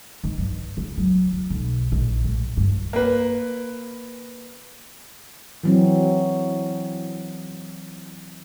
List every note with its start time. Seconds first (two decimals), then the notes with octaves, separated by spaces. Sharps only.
0.24 D#3
0.38 G2
0.77 C#3
0.98 F#3
1.32 F3
1.50 B1
1.92 A#1
2.24 A2
2.57 G2
2.93 A#3 B4
5.64 E3 F#3 C4